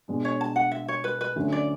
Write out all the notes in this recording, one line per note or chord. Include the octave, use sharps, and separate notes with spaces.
B2 G#3 D4
C#5
A5
F#5
E5
C#5
B4
B4
D2 D3 F#3 C#4 E4
D5